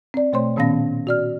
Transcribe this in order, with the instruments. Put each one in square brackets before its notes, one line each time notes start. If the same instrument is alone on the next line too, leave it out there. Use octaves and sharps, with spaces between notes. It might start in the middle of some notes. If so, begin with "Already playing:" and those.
[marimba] C4 D5
B2 A3 C5 C#5 C6
A#2 D#3 B3 C#4 F5 A#6
F#4 D5 F6